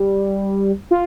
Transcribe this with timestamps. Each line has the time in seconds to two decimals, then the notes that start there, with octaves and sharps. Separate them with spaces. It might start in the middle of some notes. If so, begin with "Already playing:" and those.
Already playing: G3
0.91 F4